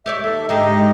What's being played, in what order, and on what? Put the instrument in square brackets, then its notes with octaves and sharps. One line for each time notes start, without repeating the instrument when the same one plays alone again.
[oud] G4 C#5 D5 [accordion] E5
[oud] D#2 [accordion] A4 E5
[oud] G#2 D3 G#3 [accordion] D#4 G4 D#5